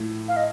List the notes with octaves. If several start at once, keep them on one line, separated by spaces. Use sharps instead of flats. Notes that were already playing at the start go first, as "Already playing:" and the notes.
Already playing: A2 F3 A3
F5
D#5